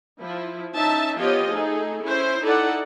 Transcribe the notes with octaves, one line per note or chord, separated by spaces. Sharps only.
F3 E4
C#4 D#4 E5 A5
F3 B3 F4 G4 C#5 D#5
A3 D#4 G#4 A4
C#4 E4 C5
D#4 E4 A4 D5 F#5